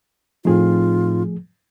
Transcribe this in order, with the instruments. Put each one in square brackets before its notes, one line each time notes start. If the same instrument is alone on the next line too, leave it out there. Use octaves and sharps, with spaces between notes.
[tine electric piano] A2 C4 D#4 [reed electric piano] F3 A3 G#4 [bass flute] F4